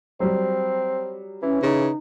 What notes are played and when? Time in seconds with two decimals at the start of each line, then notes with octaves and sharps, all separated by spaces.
0.20 F#3 G3 C4
1.42 E3 C#4
1.63 C#3 D#4